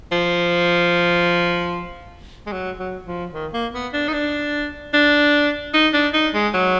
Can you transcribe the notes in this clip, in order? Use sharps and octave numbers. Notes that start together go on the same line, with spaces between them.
F3
G#3
F#3
F#3
F3
D#3
A#3
B3
D4
D#4
D4
D4
D#4
D4
D#4
G#3
F#3